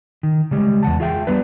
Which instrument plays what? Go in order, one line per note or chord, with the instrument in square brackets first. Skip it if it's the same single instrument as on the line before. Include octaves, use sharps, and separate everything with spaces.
[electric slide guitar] D#3
C#3 G3 G#3
E2 F#5 A5
F4 G#4 E5 G5
G3 B3 D4 B4